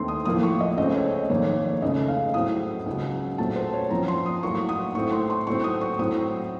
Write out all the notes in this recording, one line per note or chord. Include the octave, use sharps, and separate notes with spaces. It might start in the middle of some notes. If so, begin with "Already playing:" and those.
Already playing: D#2 D#3 A3 C4 C6
D#6
A2 F3 A#3 D#6
C#6
D#5
C#2 C#3 A3 C4 D#5
C#5
F2 D#3 A#3 C#5
C#5
C#5
C#2 C#3 A3 D#5
F5
A2 F#3 A3 C4 D#6
C#2 C#3 F#3
A#2 F#3 A3 C4 A5
C5
C#5
F#2 F3 C4 A#5
C6
D#6
A2 F#3 A#3 C#6
D#6
A2 A3 C4 C#6
C6
C6
A2 F#3 A3 C4 C#6
D#6
C#6
A2 F#3 C4 D#6